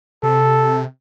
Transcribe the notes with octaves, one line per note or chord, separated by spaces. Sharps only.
C3 A4